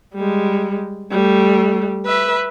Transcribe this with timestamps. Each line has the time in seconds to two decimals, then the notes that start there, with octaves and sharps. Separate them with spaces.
0.14 G3 G#3
1.11 G3 A3
2.06 B4 E5